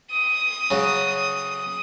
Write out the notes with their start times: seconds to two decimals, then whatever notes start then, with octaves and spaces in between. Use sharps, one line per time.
0.12 D#6
0.71 C#3 F#3